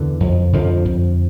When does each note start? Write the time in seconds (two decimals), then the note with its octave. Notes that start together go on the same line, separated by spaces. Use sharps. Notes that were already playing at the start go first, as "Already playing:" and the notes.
Already playing: E2 D3 E3
0.20 F2
0.53 F2 D3 F3
0.85 F2